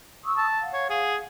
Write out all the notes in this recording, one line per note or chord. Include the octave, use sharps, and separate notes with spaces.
C#6 D#6 E6
A5
F5 F#5
C#5
G#4